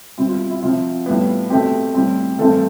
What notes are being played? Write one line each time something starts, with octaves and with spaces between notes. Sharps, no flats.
B2 G3 C4 E4
F4
E4
C3 F3 C4 F4
A2 G3 B3
B2 A3 C4 G4
A2 G3 C4
G2 E3 A3 C4 A4